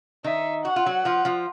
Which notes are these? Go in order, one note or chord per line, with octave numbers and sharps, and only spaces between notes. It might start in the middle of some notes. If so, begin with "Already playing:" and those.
D#3 D#4 E5
F#4 F#5
F4
F#3 F#4
F3 F4
F3 F4